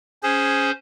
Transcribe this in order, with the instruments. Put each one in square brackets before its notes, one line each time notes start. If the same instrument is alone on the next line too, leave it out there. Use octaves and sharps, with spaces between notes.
[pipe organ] C#4 C5 [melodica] G#4